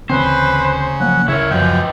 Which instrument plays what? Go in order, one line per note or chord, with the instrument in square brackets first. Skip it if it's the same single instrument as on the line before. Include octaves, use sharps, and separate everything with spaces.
[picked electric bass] D2 E3 C4 [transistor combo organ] C#3 [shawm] B4 [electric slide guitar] C5
[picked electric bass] F3 F#3 A#3 [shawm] F#5
[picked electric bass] D2 C#3 [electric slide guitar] E4 A#4 [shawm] C#5
[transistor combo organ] F#2 F3 [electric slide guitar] G#3 B4 [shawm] G5